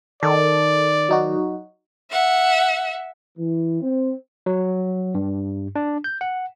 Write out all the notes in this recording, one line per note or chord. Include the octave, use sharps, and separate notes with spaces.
D#3 A4 D5
F#3 D#4 F#4
E5 F#5
E3
C4
F#3
G2
D4
G6
F#5